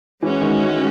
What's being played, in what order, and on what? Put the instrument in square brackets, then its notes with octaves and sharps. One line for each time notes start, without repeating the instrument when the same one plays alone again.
[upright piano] E3 [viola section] G#3 C#4 F#4
[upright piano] D#3